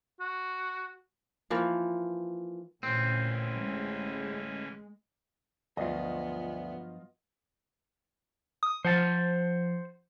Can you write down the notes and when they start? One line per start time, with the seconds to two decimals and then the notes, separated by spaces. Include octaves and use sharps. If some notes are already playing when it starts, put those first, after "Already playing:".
0.20 F#4
1.50 E3 F3 A#3
2.83 A1 A#2 D3 E3 C4 C#4
3.62 G#3
5.77 D2 G2 F3 F#3 B3 F4 D#5
8.63 D#6
8.85 F3 C5 F#5 A5